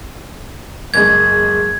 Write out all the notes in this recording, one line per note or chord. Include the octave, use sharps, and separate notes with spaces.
F#1 G#3 G#6